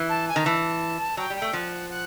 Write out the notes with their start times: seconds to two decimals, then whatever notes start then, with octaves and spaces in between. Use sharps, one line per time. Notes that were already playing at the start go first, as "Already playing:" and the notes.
Already playing: E3
0.09 A5
0.28 G#5
0.36 D#3 A#5
0.45 E3 A5
1.17 F#3 G5
1.30 G3
1.36 G5
1.42 A3
1.53 F3 F#5
1.89 F#5